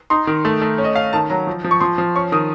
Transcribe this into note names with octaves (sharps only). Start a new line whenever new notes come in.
D#4 C6
D#3
A3
A3
C#4
D#5
C#4 F5
D#3 A5
F#3 A#5
F3
F3
C#6
F3 C6
F3
C#4 C#6
D#3 D#6